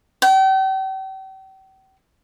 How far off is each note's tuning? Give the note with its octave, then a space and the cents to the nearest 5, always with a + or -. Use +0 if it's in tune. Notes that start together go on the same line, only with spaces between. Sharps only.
G5 -40